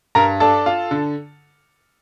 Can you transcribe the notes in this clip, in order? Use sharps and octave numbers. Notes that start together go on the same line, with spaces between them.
G2 A#4 A#5
D4 A4 A5
F4
D3